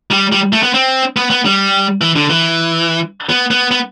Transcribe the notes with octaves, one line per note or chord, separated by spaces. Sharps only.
G3
G3
A3
B3
C4
B3
B3
G3
E3
D3
E3
B3
B3
B3